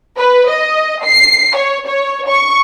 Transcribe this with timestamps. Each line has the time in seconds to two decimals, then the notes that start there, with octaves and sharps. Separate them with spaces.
0.18 B4
0.49 D#5
1.05 C7
1.56 C#5
1.87 C#5
2.28 C#6